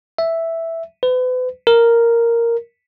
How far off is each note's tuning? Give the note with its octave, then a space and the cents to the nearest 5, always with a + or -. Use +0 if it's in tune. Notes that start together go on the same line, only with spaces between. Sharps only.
E5 +0
B4 +40
A#4 -5